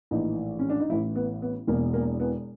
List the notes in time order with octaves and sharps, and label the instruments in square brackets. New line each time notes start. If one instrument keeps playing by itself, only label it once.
[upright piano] A#1 A2 E3 D#4
C#4
D4
D#4
A1 A2 E3 E4
B3
B3
E1 E2 B2 A#3
A#3
B3